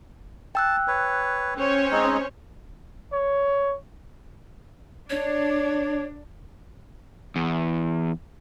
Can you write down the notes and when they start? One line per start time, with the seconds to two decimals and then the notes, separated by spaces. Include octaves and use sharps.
0.55 G5 A5 E6 F#6
0.88 B4 C#5
1.57 C#4 C5 C#5
1.91 G#3 C4 D#4
3.12 C#5
5.10 D4 C#5
7.36 E2